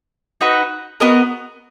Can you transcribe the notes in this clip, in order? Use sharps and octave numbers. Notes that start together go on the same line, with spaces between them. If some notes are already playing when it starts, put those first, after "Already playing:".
D#4 F#4 B4 F#5
B3 F#4 A#4 D#5